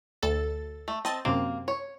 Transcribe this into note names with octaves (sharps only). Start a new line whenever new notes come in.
D2 A4 A6
A3
C4 D#5 A5 A6
F#2 C3 A#3 C4
C#5